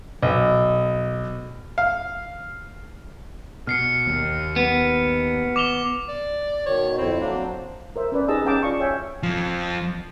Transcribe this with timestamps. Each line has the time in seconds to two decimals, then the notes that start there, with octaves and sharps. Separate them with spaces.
0.23 B1
1.78 F5
3.67 B2 F6 C7 C#7
4.06 D#2
4.56 B3
5.56 D6 F7 G7
6.09 D5
6.66 B2 D#3 C#5
6.98 F2 D3 C4 E4
7.20 F#3 A#3 D4
7.96 A#4 C5 E5
8.12 C#4 B4 D5
8.28 D#4 G4 G#4 D#5 A5 E6
8.45 C#4 D#5 F5 G5 A5 D6
8.63 F4 D5 F5 C#6
8.80 C#5 E5 G5 G#5
9.23 F2 F3